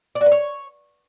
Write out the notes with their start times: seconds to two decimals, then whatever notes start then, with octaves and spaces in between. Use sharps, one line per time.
0.15 D5
0.21 F#4
0.26 B4
0.32 C#5